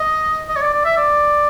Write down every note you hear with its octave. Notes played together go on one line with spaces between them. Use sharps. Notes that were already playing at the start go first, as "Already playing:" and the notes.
Already playing: D#5
D#5
C#5
D5
D5
E5
D5